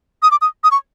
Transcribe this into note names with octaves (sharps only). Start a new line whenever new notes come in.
D#6
D6
D#6
D#6
C#6